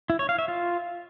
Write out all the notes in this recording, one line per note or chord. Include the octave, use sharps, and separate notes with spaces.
E4
C#5
F5
E5
F4